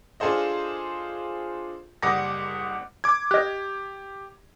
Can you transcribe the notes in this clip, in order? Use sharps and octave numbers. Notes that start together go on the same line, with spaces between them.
D4 F4 G#4 A4 C5 D#5
F#1 G3 F#5 D6 D#6 A#6
D6 G#6
G4 D#5 F#6